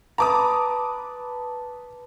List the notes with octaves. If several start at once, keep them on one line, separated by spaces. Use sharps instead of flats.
B4 A5 A#5 D6 D#6